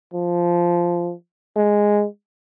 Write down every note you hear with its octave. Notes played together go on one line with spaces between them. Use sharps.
F3
G#3